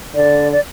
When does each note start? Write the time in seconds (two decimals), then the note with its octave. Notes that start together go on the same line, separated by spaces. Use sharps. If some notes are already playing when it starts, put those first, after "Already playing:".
0.15 D3 D5
0.52 D5